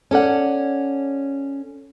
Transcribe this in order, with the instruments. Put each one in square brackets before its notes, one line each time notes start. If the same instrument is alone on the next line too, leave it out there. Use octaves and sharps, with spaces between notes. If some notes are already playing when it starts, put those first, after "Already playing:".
[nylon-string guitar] C#4 A4 D5 F#5